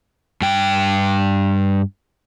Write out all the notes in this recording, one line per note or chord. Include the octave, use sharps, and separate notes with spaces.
G2 G5